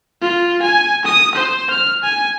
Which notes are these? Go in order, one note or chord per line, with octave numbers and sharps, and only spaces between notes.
F4
G#5
D#6
C5
F6
G#5